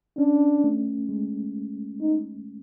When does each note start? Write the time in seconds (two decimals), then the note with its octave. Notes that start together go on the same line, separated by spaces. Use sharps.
0.17 C#4 D4
0.64 A3
1.09 G#3
2.01 D#4